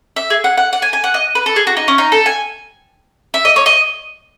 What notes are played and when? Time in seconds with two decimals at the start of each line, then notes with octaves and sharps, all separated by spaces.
0.16 E5
0.30 G#4
0.44 F#5
0.57 F#5
0.73 F#5
0.82 G#5
0.93 G#5
1.04 F#5
1.14 D#5
1.35 B4
1.46 A4
1.56 G#4
1.67 F#4
1.77 D#4
1.88 C#4
1.98 D#4
2.12 A4
2.26 G#5
3.34 E5
3.45 D#5
3.56 C#5
3.66 D#5